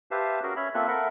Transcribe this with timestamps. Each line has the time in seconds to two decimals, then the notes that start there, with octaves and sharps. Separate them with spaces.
0.11 G4 B4 C5 E5 F5 A5
0.43 C#4 F#4 G#4 A#4
0.56 C#4 C#5 E5 B5
0.74 A#3 C4 F4 A4 E5 F#6
0.88 A4 A#4 E5 F#5 B5